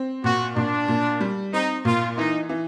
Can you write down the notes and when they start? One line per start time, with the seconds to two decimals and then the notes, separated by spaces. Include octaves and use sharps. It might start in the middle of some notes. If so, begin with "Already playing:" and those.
Already playing: C4
0.24 A#2 F#4
0.56 A#2 D4
0.88 A#2
1.21 G3
1.53 C4 D#4
1.85 A#2 F4
2.17 E3 D#4
2.49 E3